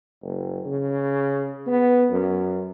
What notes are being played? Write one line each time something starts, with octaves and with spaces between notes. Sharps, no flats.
F#1
C#3
B3
F#2